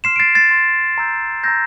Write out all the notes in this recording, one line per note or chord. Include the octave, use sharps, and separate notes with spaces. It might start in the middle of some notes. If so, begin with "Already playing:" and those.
C6 F6 C7 E7
D7
A6 C7
A6 C7
C6 F6
A#5 E6 G6
A#5 E6 G6 A#6